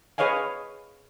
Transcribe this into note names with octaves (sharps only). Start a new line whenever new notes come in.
G#4 B4 C#5 D#5 F5 G#5